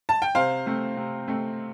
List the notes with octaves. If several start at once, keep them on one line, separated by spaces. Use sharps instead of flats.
A5
G5
C3 C5 F5
A3 C4
C3
A3 C4